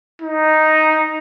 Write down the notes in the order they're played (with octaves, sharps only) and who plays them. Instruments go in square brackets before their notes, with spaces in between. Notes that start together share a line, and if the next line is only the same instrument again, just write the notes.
[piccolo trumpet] D#4